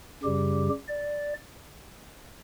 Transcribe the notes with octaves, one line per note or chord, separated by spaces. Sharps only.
F#2 C#3 G3 G4
D5